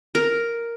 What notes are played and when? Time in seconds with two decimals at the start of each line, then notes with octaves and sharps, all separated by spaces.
0.15 A#4